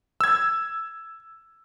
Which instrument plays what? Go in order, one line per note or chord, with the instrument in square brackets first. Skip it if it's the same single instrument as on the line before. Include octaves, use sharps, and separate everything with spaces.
[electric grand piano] E6 G#6